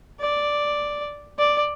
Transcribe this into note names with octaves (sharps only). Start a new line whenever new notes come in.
D5
D5